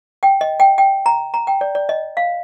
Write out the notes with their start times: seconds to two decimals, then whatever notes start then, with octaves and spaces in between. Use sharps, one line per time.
0.23 G5
0.41 D#5
0.60 G5
0.78 G5
1.06 A#5
1.34 A#5
1.47 G5
1.61 D5
1.75 D5
1.89 D#5
2.17 F5